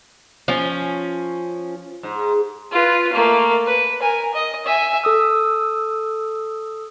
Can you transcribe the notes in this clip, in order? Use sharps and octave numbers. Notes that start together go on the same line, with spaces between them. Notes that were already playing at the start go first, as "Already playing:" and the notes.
F3 C#4
G#2
F4 B4
A3 A#3
B4
A#4 G#5
D#5
E5 G#5
A4 D#6 E6